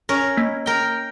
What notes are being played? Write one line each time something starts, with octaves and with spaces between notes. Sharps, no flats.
C#4 A#4
A#3
A#4 G5